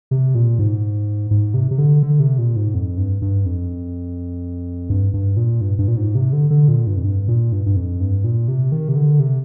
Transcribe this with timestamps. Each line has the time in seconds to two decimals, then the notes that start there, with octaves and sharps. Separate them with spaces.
0.11 C3
0.35 A#2
0.59 G#2
1.31 G#2
1.54 C3
1.71 C3
1.78 D3
2.03 D3
2.20 C3
2.38 A#2
2.56 G#2
2.74 F2
2.98 G2
3.22 G2
3.46 F2
4.90 G2
5.13 G2
5.37 A#2
5.61 G2
5.79 G2
5.88 A#2
5.97 G#2
6.15 C3
6.33 D3
6.50 D3
6.68 A#2
6.87 G2
6.97 F2
7.05 G2
7.28 A#2
7.52 G2
7.66 G2
7.76 F2
8.00 G2
8.24 A#2
8.48 C3
8.72 D#3
8.88 C3
8.96 D3
9.20 C3